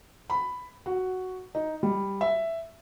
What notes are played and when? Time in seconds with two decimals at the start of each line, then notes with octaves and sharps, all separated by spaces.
0.30 B5
0.86 F#4
1.55 D#4
1.83 G3
2.21 E5